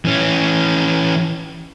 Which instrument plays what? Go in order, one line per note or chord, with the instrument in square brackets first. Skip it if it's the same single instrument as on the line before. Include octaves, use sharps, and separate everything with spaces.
[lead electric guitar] E3 C#4